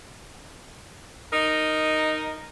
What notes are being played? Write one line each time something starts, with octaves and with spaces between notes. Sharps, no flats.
D#4 A#4 D#5